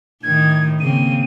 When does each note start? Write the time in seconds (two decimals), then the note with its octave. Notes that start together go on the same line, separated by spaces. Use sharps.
0.23 A2 D#3 G#6
0.80 C#3 A#3 C4 D#7